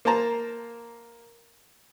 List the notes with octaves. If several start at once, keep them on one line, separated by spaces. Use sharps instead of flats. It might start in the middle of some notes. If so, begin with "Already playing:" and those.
A#3 A#4 C5 A5 A#5